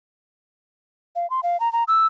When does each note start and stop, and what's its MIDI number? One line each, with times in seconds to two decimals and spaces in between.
1.16 1.29 77
1.30 1.41 84
1.43 1.59 77
1.60 1.71 82
1.73 1.84 82
1.88 2.07 88